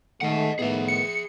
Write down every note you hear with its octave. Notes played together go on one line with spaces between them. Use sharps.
D#3 G#3 A3 D#5 F#5
A2 D#3 B3 G#4 E5
C#7